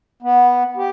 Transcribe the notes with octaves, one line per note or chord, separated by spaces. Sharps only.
B3
G4